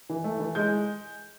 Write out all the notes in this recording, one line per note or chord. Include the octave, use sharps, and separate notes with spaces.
E3
A3
E3
G#3 G6